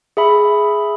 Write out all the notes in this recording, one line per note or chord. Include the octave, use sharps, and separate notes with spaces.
G#4 E5 B5